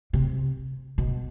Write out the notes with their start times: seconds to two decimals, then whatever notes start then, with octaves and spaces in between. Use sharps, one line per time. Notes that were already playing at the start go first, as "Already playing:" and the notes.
0.13 C3
0.98 B2